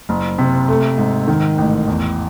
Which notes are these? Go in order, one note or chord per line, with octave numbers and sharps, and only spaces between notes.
F#1
C3
A3
G#2
D#3
A1
E2